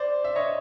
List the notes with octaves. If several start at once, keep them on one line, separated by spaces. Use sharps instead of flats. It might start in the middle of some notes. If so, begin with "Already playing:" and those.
Already playing: C5 D5
E5
C#5 D#5